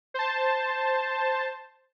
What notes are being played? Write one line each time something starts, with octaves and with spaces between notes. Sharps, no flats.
C5 A5